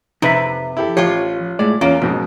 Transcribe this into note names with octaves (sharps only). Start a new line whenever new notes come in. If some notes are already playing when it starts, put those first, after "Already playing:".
F2 C3 D#4 B4 E5
E4 G4 A4
A1 F3 F4 G4 C#5
A2 G#3 D5
E2 A#3 C#4 F4
F2 G#2 B2